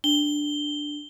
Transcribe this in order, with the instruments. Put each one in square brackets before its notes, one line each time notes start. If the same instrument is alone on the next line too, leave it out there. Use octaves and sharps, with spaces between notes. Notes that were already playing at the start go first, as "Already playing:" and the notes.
[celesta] D4 [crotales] G7